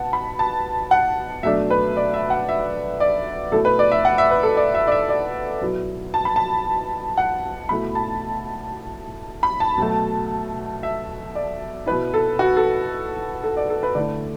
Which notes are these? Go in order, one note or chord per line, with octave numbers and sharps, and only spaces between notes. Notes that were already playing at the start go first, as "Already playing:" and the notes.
Already playing: B2 B3 F#5 A5
B5
A5
F#5
B2 F#3 A3 D4 E5
B4
D5
E5
F#5
E5
D5
B2 A3 E4 A4
B4
D5
E5
F#5
E5
B4
A4
D5
E5
D5
E5
D5
B2 F#3 B3 E4
A5
B5
A5
F#5
B2 A3 E4 B5
A5
B5
A5
B2 F#3 A3
E5
D5
B2 B3 E4 B4
A4
F#4
A4
A4
D5
A4
B4
D3 A3 E4 D5